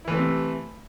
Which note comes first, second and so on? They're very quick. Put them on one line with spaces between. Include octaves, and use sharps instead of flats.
E4 E3 A3 C4 C3